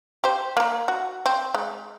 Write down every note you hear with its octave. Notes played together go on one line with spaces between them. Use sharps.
G4 C5
A#3 A#4
F#4
C4
G#3